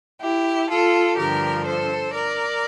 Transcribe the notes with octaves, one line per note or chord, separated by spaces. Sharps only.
E4 G4
F4 A4
G2 D3 F3 G4 A#4
A4 C5
A#4 D5